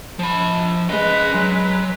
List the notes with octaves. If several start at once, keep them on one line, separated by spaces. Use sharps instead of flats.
F3 B5
G#3 C#4 B4 D#5
F#3